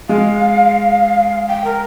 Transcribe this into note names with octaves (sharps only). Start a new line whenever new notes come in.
G#3 F5
G5
A#4